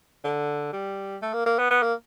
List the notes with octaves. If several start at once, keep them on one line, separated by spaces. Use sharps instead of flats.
D3
G3
A3
A#3
A#3
B3
B3
A#3